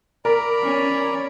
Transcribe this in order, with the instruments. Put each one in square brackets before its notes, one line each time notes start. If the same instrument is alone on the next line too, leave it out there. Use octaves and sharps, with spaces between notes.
[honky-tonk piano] A#4 [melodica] D5 A#5 B5
[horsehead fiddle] C#4 C#5